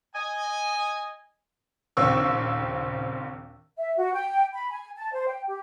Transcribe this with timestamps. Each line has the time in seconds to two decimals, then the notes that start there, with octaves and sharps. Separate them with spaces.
0.15 D#5 G#5
1.97 A#1 D#2 C#3 C4 C#6 E6
3.77 E5
3.97 F#4
4.13 G5
4.53 B5
4.71 G#5
4.96 A5
5.13 C5
5.27 G5
5.47 G4